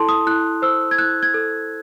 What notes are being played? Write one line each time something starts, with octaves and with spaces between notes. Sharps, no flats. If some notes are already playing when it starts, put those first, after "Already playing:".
Already playing: E4 A4 A5 C6
D#6
E4 F#6
C5 E6
G#6
E4 F#6
G#6
A4